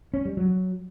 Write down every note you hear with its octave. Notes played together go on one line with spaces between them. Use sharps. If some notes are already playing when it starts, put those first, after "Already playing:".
C#4
G3
F#3